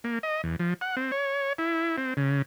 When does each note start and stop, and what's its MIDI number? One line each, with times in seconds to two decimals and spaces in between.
0.04 0.19 58
0.23 0.42 75
0.44 0.56 40
0.59 0.74 53
0.81 0.96 78
0.97 1.11 60
1.12 1.53 73
1.58 1.96 64
1.98 2.14 60
2.17 2.42 49